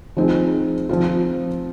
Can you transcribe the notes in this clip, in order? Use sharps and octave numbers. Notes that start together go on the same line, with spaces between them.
F3 C4 D#4 G#4
F3 C4 F4